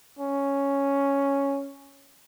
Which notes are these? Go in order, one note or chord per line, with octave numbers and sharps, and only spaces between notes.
C#4